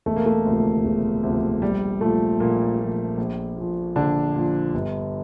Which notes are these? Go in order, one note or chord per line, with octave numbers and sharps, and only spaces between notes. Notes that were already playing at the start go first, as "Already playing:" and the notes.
E1 A3
A#3
A3
D2 C3 F3
E1
D2 C3 F3
A#1 G3
A#2 F3 A3
A#1 A#2 A#3
A#2
F3
A#1
A#2 F3
A#1 D3 D4
A#2 F3
G1